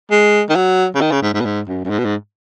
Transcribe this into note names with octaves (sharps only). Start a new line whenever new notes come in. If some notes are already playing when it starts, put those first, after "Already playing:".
G#3
D#3
F#3
C#3
D#3
C#3
G#2
G#2
B2
G#2
F#2
F#2
G#2
B2
G#2